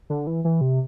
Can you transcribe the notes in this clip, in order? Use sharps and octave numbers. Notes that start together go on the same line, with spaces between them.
D3
E3
E3
C3